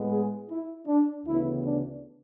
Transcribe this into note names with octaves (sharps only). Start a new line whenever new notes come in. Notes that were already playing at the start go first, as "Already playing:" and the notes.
Already playing: A2 G#3 B3
G#4
E4
D4
D2 C#3 E3 B3 E4
D4